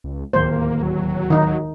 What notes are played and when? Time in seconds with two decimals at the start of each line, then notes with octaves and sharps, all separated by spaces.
0.04 C#2
0.33 D1 D#2 A#3 C5
0.83 F#3
1.30 D#3 D#4